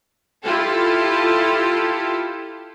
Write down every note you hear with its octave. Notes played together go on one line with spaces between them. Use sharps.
E4 F4 G4 A4